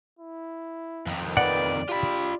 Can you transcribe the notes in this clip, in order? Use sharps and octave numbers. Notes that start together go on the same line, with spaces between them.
E4
F2 D#3
B4 D5 F#5
F4 G4 B5